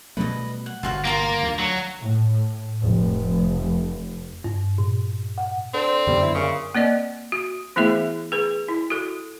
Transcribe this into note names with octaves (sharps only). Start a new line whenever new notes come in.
B2 G3 A3 B4 D#5
F#5
G1 C3 F4 F#4 F5
A#3 F4 F#4 A#5
D2
F#3
A2
F1
G2
A#2
F#5
D3 C4
F#2 D3 G3 B3
E4
A#2 C#3
A#3 C4 D5 D#5
F#4
E3 A3 B3 E4 G#4 E5
G#4 B4
E4
F#4 A4